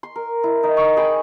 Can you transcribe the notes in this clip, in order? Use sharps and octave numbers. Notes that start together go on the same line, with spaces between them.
C6
A#4
E4
D#4
C#6
G#4 G5 G#5 B5